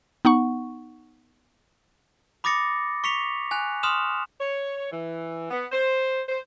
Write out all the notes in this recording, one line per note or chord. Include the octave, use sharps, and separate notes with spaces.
B3 D#4 F#5 C#6
B5 D6 D#6 A6 A#6 C#7
C#6 B6 C#7 F7
G#5 F#6 F7
C6 D#6 F6 E7 F7
C#5
E3
B3
C5
C5